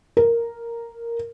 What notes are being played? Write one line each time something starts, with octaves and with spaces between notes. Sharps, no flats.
A#4